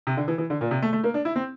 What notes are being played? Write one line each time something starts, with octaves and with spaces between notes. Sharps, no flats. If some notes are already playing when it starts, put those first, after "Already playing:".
C3
D3
E3
E3
D3
A#2
C3
A3
A3
A#3
D4
E4
C4